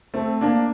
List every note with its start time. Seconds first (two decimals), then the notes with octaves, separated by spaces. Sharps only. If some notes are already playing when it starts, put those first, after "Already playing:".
0.14 A3 C4
0.41 A#3 D4